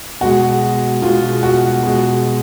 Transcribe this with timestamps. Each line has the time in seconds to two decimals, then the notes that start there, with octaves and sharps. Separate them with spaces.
0.21 B2 G#3 F#4
1.02 B2 G#3 F4
1.43 F#4
1.83 B2 G#3